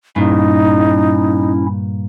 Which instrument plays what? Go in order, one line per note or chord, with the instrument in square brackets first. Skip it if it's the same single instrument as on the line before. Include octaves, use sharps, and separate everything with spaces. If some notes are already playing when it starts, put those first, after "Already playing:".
[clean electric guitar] G2 A#2 [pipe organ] C#4 E4 [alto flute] D#4